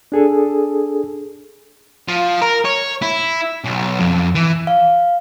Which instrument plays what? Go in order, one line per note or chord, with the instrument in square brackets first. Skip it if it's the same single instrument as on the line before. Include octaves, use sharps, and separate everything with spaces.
[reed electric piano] D4 G#4 A4
[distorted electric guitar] F3
A#4
C#5
E4
B1
F2
E3
[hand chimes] F5